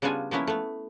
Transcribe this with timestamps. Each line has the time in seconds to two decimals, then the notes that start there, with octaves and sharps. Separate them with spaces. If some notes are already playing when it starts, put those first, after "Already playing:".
0.02 C#3 G3 B3 D4 F4 G#5
0.31 F3 A#3 B3 C#4 E4
0.47 A3 B3